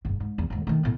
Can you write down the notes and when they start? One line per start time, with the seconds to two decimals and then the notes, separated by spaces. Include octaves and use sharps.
0.05 F#1 G2
0.20 G#2
0.38 E2
0.50 D#2 G#2
0.67 D#3 A3
0.83 A2 B3